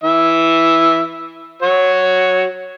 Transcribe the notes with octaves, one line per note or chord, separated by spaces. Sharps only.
E3 E5
F#4 C#5